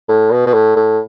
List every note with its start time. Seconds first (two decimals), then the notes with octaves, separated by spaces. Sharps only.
0.09 A2
0.31 B2
0.46 B2
0.53 A2
0.76 A2